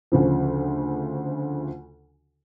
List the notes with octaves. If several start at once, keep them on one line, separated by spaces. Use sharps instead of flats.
D2 C#3 F3